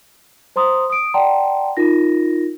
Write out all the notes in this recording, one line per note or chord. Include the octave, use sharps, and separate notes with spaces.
C5 A#5 C6 D#6
D#6 D7
D5 F#5 G5 A5 A#5 C6
D#4 F4 A#4 A#6